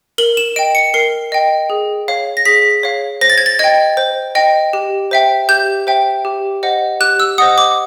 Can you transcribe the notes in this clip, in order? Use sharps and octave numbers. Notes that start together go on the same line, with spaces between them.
A#4 F#7
E7
D#5 G5 D7
C#7
A#4 C7
D#5 G5
G#4
C#5 F5
A#6
G#4 B6
C#5 F5
C5 A#6
A6
G#6
A6
D#5 G5 G#6
C5
D#5 G5
G4
C5 E5 G5
G4 G6
C5 E5 G5
G4
C5 D#5 F#5
G4 F#6
E6
C5 D#5 F#5 D#6
D6